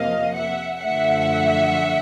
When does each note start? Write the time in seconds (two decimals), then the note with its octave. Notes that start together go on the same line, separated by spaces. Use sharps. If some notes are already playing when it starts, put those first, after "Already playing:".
Already playing: F2 C3 F3 A#3 D#5 F5
0.35 E5 F#5
0.82 F#2 D3 F3 A3 E5 F#5